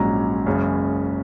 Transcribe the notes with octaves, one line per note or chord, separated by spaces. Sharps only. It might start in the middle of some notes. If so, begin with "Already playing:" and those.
Already playing: A#1 G#2 F#3 C#4 A#5
F#1 F#2 C#3 G#3 C#4